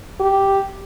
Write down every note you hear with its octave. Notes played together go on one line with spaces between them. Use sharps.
G4